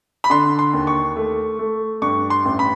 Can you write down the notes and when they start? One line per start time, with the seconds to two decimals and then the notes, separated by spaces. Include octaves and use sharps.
0.24 B5
0.30 D3 C6
0.59 C6
0.73 D#2
0.87 C#6
1.16 A3
1.59 A3
2.02 G2 C#6
2.30 C6
2.45 A1
2.59 B5